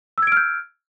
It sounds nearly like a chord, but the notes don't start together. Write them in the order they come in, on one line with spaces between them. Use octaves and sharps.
E6 G#6 D7 F6 G6